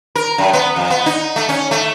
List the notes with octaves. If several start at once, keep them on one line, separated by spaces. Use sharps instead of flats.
A#4
F#2
B3
F2
B3
D#4
A3
C#4
A3